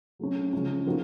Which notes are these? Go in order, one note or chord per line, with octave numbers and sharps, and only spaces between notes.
F#3 A3 C#4
C#3 F3 G#3 C#4
F3 A#3 D#4 F#4